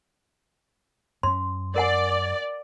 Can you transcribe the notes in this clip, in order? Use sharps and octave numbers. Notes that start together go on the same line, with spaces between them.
F#2 C#4 C6
A#4 D5 F#5 G#5